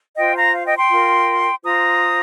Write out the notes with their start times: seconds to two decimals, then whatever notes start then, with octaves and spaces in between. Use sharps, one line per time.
0.16 F4 C5 D#5 G5
0.34 F5 A#5
0.52 F5
0.65 D#5 G5
0.77 G5 C6
0.89 F4 A#4
1.63 F4 C5 A#5 D#6